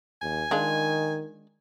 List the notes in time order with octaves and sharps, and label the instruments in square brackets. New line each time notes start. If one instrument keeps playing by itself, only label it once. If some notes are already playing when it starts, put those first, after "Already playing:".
[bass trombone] D#2 [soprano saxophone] G#5
[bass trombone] D#3 [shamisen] G#3 D4 F4